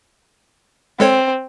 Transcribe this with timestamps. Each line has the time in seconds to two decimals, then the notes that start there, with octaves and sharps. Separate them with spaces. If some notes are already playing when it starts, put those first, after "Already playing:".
1.00 G#3 C4 A4 C#5